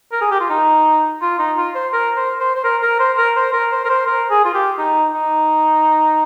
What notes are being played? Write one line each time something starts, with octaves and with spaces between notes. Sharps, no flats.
A#4
G#4
G4
F4
D#4
F4
D#4
F4
C5
A#4
C5
C5
C5
A#4
A#4
C5
A#4
C5
A#4
C5
A#4
C5
A#4
G#4
F4
G4
D#4
D#4